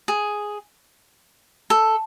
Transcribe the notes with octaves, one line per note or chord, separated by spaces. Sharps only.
G#4
A4